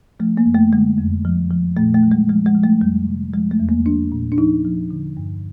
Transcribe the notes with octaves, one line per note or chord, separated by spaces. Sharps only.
F3 A3
A#3
F#2
A3
D3 G#3
F2
F3
F3
A#2 A3
A3
F#3
G#3
F3 G#3
G#3
F3
A3
F2 G3
C3
F3 G#3
A3
E2
A#3
F3 D4
A#2
D4
F3 D#4
F3
D3
G2